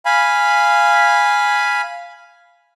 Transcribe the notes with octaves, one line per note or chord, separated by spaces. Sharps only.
F5 G#5 B5